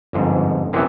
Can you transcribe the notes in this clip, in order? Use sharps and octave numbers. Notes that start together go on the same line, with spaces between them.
G1 F2 G#2
F#2 C3 E3 B3 E4